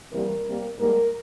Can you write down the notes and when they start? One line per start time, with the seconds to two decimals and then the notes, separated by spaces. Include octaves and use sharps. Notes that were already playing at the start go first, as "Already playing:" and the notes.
0.12 E2 C3 E3 G3 A#3 A#4
0.45 C3 G3 A#3
0.78 G#2 G3 A#3 A#4